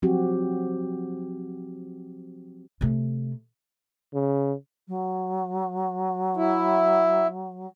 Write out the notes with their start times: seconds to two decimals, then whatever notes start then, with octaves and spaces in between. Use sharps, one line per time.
0.02 F3 F#3 C4 F#4 G4
2.81 C3 A3
4.14 C#3
4.88 F#3
6.37 E4